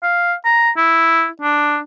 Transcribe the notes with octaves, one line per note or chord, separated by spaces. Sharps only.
F5
A#5
E4
D4